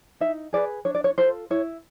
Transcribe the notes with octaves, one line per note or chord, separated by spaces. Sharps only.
D#4 E5
G#4 B4 D5
D4 C#5
D5
C#5
F4 A4 C5
E4 C#5